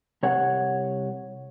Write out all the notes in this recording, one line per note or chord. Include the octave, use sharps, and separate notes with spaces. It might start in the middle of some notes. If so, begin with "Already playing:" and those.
C2 C#5 F#5